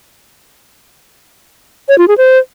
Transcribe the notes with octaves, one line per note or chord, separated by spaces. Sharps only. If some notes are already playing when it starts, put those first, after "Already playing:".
C#5
F4
G#4
C5